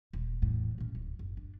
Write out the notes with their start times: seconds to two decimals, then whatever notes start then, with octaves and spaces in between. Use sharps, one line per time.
0.13 D#1
0.42 E2 A2
0.78 A#2 C#4
0.95 D1
1.19 F#1
1.37 D4